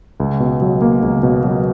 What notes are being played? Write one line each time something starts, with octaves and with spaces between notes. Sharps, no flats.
C#2
B2
F#3
A#3
C#2
B2
F#3